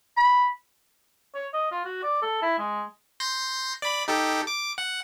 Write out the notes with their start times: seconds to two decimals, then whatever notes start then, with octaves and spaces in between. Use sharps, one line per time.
0.17 B5
1.35 C#5
1.54 D#5
1.72 F4
1.85 F#4
2.03 D5
2.22 A4
2.42 E4
2.59 G#3
3.20 C6 G6 A#6
3.82 D5 B5
4.08 D#4 G4 A4
4.47 D6
4.78 F#5